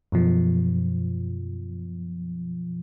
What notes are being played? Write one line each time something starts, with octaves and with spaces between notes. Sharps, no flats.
F#2 B2 F3